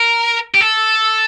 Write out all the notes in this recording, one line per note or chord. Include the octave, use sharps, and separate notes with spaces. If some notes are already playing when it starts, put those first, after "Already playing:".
Already playing: A#4
G4
A4